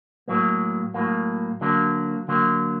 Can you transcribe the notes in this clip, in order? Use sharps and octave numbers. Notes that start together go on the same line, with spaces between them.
A2 F#3 A#3
A2 F#3 A#3
D3 F#3 A#3
D3 F#3 A#3